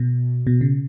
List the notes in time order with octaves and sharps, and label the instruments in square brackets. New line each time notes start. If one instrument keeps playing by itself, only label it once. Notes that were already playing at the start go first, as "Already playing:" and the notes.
Already playing: [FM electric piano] B2
B2
C#3